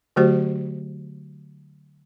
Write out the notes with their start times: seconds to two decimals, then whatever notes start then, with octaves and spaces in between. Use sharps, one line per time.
0.16 D3 F#3 A3 F#4 G4 C5